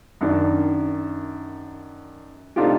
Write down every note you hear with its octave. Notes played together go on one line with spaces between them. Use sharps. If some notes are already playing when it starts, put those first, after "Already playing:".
F#2 D#3 D4
C3 A3 D4 D#4 F4 G4